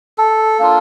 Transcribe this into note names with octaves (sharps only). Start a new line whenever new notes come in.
A4
A#3 D4 F4